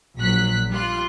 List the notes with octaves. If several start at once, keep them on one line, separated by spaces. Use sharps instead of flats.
A#1 A#2 F#3 F#6 B6
G3 F4 F#6